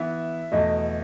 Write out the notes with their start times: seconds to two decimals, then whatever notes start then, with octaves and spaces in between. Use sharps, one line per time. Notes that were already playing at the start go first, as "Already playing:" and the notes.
Already playing: E3 B3 E4 E5
0.52 E2 B2 A3 D#5